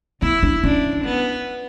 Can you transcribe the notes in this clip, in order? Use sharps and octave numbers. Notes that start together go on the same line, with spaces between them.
B3 E4
D4
C#4 D4
B3